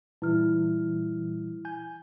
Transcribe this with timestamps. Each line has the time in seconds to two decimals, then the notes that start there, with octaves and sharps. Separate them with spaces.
0.22 A#2 E3 G3 E4 F6
1.65 G#5 G6